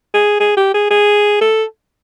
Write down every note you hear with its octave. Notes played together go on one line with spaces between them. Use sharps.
G#4
G#4
G4
G#4
G#4
A4